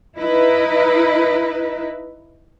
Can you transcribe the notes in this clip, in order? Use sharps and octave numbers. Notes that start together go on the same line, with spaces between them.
D#4 E4 B4